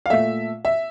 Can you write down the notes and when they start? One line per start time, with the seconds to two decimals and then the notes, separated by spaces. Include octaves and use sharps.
0.06 F5
0.10 A#2 A3 E5
0.65 E5